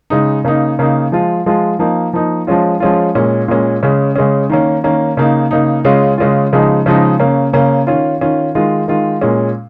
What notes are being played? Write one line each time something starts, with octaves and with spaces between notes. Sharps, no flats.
C#3 G#3 D#4
C#3 A#3 D#4
C#3 A#3 D#4
F3 G#3 F4
F3 G#3 F4
F3 A#3 D#4
F3 A#3 D#4
F3 G#3 C#4 F4
F3 G#3 C#4 F4
A#2 G#3 C#4
A#2 G#3 C#4
C#3 G#3 C#4
C#3 G#3 C#4
D#3 A#3 C#4
D#3 A#3 C#4
C#3 A#3 D#4
C#3 A#3 D#4
C#3 G#3 C#4 F4
C#3 G#3 C#4 F4
C#3 F3 G#3 D#4
C#3 F3 G#3 D#4
C#3 A#3 C#4
C#3 A#3 C#4
D#3 C#4 F4
D#3 C#4 F4
D#3 G#3 F4
D#3 G#3 F4
A#2 G#3 C#4